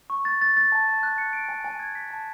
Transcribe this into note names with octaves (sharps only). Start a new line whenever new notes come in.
C#6
A6
A6
A6
A5
A5
F#6
C#7
D7
G#5
G#5
G#6
B6
A5